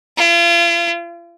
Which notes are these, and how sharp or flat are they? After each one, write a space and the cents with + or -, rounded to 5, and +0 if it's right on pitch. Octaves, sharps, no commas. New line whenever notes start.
F4 -40